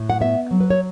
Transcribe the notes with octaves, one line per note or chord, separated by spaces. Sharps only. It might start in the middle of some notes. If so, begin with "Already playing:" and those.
Already playing: A2
F#5
B3 E5
F#3
B4
C#5